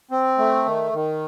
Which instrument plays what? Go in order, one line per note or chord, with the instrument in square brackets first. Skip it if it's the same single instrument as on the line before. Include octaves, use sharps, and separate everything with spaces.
[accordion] C4
A3
D#3
D#3